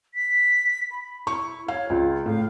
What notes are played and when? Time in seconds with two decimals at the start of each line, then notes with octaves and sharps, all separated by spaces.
0.14 B6
0.92 B5
1.27 E4 C#6
1.68 C#5 F5
1.90 C#2 F4
2.26 A2 F5